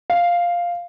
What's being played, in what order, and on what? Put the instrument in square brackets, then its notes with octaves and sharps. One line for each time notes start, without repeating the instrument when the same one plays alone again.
[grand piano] F5